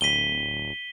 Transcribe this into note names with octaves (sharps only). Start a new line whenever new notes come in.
D1 B6 D#7 G7